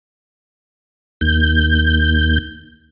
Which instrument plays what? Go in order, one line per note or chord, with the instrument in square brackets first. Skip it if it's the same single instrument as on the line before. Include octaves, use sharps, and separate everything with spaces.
[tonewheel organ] D#2 G6